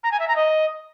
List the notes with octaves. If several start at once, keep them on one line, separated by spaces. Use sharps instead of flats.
A#5
G#5
E5
A#5
D#5